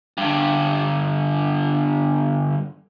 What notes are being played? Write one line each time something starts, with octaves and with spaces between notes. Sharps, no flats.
G2 D3